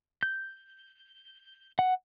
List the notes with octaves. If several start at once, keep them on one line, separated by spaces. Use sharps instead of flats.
G6
F#5